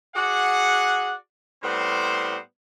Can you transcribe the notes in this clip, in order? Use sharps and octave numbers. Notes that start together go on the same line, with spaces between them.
F#4 G#4 D5 F#5
A2 G3 B3 C4 C5